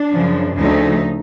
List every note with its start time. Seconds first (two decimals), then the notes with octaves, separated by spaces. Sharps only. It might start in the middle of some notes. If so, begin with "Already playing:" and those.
Already playing: D4
0.14 F#2 C#3 F3
0.56 D2 C#3 F3 A3 D#4